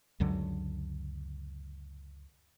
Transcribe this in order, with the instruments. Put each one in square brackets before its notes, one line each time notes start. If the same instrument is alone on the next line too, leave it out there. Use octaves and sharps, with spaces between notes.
[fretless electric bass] C#2 F#2 D3 F#3